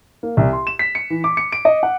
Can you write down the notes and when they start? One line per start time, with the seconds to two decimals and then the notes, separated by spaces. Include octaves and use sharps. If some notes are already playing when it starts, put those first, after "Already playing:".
0.23 A#3
0.37 C2
0.53 C6
0.67 E7
0.79 B6
0.95 C#7
1.10 E3
1.24 D6
1.37 C#7
1.52 D7
1.65 D#5
1.83 F#5